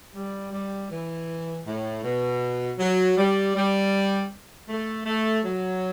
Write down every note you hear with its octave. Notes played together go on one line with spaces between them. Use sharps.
G3
G3
E3
A2
B2
F#3
G3
G3
A3
A3
F#3